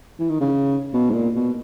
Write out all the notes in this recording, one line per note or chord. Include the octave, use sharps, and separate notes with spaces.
E3
D#3
C#3
B2
G#2
A#2
B2